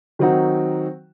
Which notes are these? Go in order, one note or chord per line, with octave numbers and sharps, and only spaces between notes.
D#3 F#3 C4 D#4 F#4